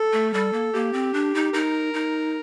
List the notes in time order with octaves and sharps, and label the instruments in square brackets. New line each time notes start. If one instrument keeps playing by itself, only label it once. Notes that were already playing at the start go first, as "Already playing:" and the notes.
Already playing: [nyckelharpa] A4
[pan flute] A3
[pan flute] G3 [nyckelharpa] A4
[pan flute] A#3
[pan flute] A#3 [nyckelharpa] G4
[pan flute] C4
D4
D#4
[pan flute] D#4 [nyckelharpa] A#4
[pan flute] D#4